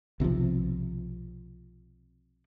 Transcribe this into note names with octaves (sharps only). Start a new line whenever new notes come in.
B1 C3 D#3 F3